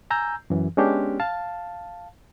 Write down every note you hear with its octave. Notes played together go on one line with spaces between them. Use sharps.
G#5 A#5 E6 G6
F#2 E3
G#3 B3 C#4 D4 G4
F5 A5